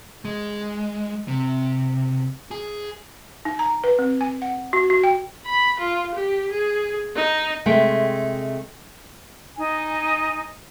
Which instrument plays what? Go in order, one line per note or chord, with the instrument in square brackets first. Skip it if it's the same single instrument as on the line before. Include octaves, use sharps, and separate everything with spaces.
[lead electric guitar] G#3
C3
G#4
[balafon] D#4
A#5
B4
C4
G#5
F#5
F#4
F#4
G5
[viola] B5
F4
G4
G#4
D#4
[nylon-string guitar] C3 G#3 A3 G#4 G5
[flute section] D#4 G#5